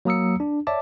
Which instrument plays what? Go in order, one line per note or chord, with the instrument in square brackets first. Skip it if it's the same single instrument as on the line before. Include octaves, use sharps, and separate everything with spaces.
[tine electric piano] F#3 A#3 A#5 D#6 E6 C#7
D4
C#5 D5 E5 A5 D6